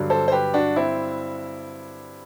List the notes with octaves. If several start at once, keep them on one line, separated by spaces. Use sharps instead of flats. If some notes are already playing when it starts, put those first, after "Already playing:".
Already playing: G2 D3 F#3
A4 C5
C5
G4 B4
D4 F#4
C4 E4